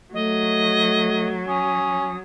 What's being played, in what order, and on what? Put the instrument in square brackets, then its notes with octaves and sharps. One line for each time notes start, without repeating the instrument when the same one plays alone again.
[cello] F#3 [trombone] A3 [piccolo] D#5
[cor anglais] C#4 [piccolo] D#6